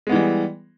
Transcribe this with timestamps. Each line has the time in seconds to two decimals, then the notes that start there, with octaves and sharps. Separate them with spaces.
0.07 G#3
0.09 B3
0.12 E3
0.15 G3